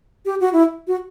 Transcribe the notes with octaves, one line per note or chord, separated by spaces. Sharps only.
G4
F#4
E4
F#4